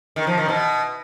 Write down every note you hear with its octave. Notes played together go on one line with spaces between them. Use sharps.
D#3
F3
D#3
B2